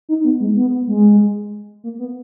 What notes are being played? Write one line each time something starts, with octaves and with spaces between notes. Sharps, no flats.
D#4
B3
G#3
B3
G#3
A#3
B3